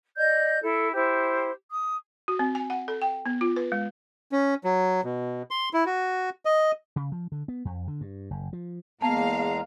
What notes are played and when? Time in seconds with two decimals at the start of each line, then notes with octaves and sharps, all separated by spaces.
0.16 D5 D#5 G6
0.62 E4 A4
0.93 E4 G4 C5
1.70 D#6
2.28 F#4
2.39 C4
2.55 G#5
2.70 F#5
2.88 A4
3.02 G5
3.26 B3
3.41 F4
3.56 B4
3.72 G#3
4.32 C#4
4.64 F#3
5.04 B2
5.51 C6
5.73 E4
5.86 F#4
6.45 D#5
6.96 C#3
7.12 F3
7.32 D3
7.48 B3
7.65 F2
7.88 D3
8.01 G2
8.31 F#1
8.53 F3
9.02 E2 G#3 A#3 B3 F5 A5 A#5